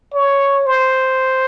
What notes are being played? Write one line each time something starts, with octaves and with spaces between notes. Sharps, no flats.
C#5
C5